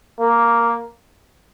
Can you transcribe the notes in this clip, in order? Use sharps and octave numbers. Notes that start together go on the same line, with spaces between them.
A#3